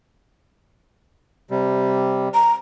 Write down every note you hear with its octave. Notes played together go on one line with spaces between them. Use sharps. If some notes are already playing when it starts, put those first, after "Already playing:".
C3 G3
A#5